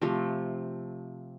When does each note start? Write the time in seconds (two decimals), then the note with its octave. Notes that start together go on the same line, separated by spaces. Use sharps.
0.01 C3 F3 A3